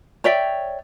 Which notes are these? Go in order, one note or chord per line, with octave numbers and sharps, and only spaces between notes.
C#5 D5 E5 G5